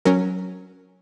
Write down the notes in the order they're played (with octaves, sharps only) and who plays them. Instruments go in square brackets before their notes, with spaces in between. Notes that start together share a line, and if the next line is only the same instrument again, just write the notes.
[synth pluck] F#3 C#4 A#4